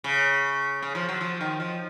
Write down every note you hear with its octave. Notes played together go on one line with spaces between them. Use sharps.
C#3
C#3
F3
F#3
F3
D#3
F3